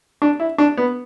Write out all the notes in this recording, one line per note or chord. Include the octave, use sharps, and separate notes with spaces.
D4
E4
D4
B3